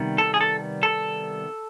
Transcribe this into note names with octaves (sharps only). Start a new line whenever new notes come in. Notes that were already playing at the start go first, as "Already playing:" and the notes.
Already playing: C3 D#3 G3 B3
A4
G#4
A4
A4